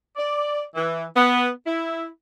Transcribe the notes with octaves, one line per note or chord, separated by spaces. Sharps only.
D5
E3
B3
E4